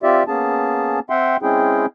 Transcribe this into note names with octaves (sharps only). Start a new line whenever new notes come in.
C4 F4 G4 D5 E5
A#3 B3 C#4 G#4 A5
C4 E5 F#5 G5 C6
G#3 C4 C#4 E4 G#4 G5